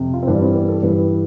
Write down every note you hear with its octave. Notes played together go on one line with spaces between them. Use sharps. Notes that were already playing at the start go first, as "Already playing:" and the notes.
Already playing: F2 C3
F4
C4
G2 E3 G3 D4
C4
B3
A4
G2 E3 G3 B4